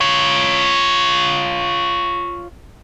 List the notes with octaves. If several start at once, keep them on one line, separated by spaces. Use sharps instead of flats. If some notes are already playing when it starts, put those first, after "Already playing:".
F4 C#5